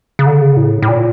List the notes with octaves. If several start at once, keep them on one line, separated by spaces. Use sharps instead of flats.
C#3
D3
C#3
A2
A2
A#2